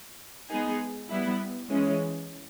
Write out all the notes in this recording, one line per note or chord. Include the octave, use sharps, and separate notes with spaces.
G#3 B3 D#4 G#4
G3 B3 E4
E3 G#3 C#4